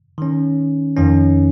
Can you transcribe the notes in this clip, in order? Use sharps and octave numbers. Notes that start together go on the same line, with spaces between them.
D#3 C#4
F2 D#3 C#4